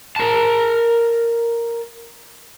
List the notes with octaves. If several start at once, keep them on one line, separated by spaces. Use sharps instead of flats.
A#4 A5